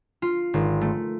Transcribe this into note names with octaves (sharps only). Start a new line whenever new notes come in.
F4
G#1
A3